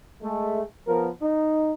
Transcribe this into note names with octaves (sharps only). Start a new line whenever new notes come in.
G#3 A3
F3 B3 A#4
D#4